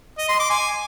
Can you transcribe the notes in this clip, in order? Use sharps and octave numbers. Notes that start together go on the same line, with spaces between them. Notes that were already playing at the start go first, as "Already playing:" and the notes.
D#5
C6
D6
G#5